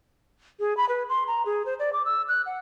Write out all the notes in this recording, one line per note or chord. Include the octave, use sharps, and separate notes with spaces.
G#4
B5
B4
C6
A#5
G#4
C5
D5
D6
E6
F#6
F#5